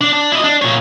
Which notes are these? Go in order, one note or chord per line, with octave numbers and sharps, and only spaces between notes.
D4
D4
E4 D#5
D4
A#2 C#5